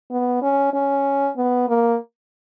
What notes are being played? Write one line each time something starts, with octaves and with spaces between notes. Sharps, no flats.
B3
C#4
C#4
B3
A#3